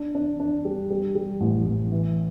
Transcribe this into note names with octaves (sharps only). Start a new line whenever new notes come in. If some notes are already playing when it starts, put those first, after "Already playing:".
Already playing: D4
D4
D4
G3
G3
G3
A1
A1
E3